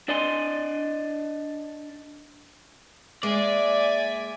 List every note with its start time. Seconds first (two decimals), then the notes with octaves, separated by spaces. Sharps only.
0.08 D4 D5 D#5 G#5 C6
3.23 G#3 A#3 D5 E5 G#5